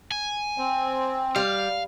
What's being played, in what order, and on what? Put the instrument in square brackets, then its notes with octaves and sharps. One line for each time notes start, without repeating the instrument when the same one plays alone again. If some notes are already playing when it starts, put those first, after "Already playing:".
[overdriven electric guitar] G#5
[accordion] C4
[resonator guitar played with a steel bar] G3 [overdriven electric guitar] F5